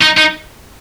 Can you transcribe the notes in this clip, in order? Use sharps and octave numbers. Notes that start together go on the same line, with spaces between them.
D#4
D#4